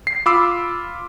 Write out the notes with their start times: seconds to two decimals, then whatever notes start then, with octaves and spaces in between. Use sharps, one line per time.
0.07 C7
0.26 F4 B5 D6 E6